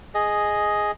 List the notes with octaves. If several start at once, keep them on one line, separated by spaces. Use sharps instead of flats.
G#4 D#5